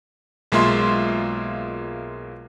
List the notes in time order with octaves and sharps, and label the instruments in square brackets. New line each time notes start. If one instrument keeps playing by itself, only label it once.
[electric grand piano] B1 G#3 A#3 F4 E5 C6